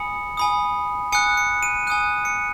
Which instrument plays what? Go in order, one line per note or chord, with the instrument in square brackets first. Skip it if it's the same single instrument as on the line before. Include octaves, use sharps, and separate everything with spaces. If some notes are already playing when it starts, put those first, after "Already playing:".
Already playing: [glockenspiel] G#5 B5 D#6 C#7
G#5 B5 D#6
G#5 D#6 F#6 C#7
C#7
D#7
G#5 D#6 F#6 D#7
C#7